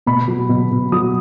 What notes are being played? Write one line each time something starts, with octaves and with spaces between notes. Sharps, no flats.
B2 B5
F#3
B2
B2
F#3 D#6